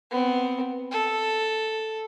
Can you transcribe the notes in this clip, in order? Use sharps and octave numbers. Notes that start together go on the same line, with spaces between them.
B3 C4
A4